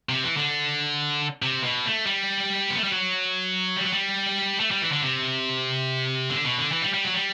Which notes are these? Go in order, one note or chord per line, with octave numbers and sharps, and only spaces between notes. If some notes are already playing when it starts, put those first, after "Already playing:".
C3
E3
D3
C3
B2
A3
G3
B3
A3
G3
F#3
G3
F#3
G3
A3
G3
E3
D3
C3
D3
B2
D3
E3
G3
G3
F#3
G3